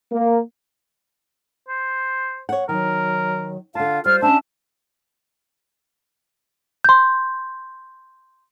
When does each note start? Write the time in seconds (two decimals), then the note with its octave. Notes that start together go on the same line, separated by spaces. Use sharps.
0.12 A#3
1.68 C5
2.49 C#5 F#5
2.69 D#3 F#3 A#4
3.75 D3 F4 F5 A5
4.06 G3 F4 C5 F6
4.22 C#4 D4 E5 A5
6.84 C6 G6